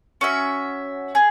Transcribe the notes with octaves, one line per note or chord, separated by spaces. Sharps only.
C#4 F#4 E5
G#4